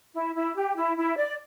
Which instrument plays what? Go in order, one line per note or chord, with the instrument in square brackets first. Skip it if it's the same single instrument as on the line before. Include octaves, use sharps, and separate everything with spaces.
[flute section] E4
E4
G4
E4
E4
D5